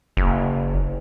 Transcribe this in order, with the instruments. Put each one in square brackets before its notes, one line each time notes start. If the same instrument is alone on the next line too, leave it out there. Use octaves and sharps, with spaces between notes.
[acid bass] F#1